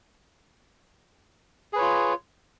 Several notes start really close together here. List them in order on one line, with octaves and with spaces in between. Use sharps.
G#4 B4 C#5 F4